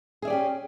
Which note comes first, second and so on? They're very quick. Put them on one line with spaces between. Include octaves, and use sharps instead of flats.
G#4 E5 D5 G4 C#4